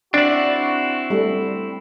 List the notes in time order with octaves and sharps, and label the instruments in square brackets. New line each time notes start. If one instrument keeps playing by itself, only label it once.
[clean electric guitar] C4 E4 [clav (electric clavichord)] D4 D5 [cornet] F#4
[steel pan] G3 A3